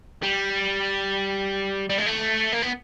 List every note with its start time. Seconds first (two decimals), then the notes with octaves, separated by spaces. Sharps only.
0.23 G3
1.90 G3
1.98 G#3
2.06 A3
2.52 A#3
2.62 B3